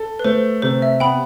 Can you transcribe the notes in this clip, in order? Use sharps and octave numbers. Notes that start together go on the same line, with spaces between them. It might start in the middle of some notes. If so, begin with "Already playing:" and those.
Already playing: A4
B4
A3 C5
C3 C5
E5
B3 G5 B5